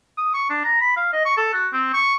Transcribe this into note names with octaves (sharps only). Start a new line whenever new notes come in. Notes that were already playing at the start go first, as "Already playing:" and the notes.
D#6
C#6
D4
A#5
B5
F5
D#5
C#6
A4
F#4
C4
C#6